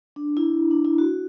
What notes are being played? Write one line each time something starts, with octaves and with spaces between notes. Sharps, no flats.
D4
E4
D4
E4
F#4